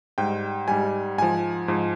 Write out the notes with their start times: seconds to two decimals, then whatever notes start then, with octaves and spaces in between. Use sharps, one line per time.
0.18 G#2 G3 G5
0.68 G#2 G3 G#5
1.18 G#2 F3 G#5
1.68 G#2 F3